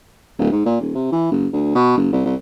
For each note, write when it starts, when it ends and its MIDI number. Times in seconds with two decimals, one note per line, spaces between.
0.38 0.49 26
0.52 0.62 44
0.66 0.77 46
0.81 0.92 27
0.95 1.08 48
1.12 1.29 52
1.31 1.47 30
1.53 1.70 38
1.75 1.93 47
1.97 2.08 30
2.12 2.21 36
2.26 2.35 36